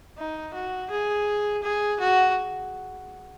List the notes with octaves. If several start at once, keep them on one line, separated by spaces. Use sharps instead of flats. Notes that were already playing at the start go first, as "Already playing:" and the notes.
D#4
F#4
G#4
G#4
F#4